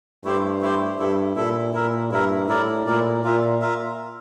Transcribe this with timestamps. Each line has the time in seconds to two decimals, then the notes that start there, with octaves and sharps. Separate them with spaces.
0.24 G2 A3 E4 G4 C5
0.61 A3 E4 G4 C5
0.99 G2 E4 A4 E5
1.36 A#2 E4 A4 E5
1.73 A#2 E4 A#4 E5
2.11 G2 E4 A#4 E5
2.48 A2 E4 A#4 D5
2.86 A#2 E4 A#4 D5
3.24 A#2 F4 A#4 E5
3.61 F4 A#4 E5